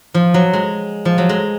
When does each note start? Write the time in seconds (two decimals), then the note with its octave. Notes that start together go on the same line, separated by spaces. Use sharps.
0.14 F3
0.34 F#3
0.53 G#3
1.05 F3
1.18 F#3
1.29 G#3